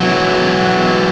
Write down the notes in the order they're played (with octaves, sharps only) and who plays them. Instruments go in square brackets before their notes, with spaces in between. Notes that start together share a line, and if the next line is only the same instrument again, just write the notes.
[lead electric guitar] E3 F#3